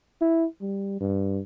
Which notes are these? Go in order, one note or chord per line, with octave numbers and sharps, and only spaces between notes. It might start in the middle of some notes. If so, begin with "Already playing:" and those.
E4
G3
G2